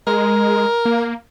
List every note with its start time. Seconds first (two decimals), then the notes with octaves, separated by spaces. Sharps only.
0.07 G#3 A#4
0.85 A#3